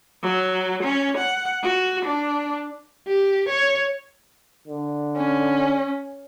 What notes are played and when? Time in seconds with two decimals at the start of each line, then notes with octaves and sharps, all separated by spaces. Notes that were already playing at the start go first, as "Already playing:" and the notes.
0.23 F#3
0.84 C#4
1.18 F#5
1.63 F#4
2.06 D4
3.07 G4
3.48 C#5
4.67 D3
5.17 C#4